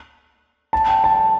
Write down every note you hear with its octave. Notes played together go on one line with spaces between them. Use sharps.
A5
G5
A5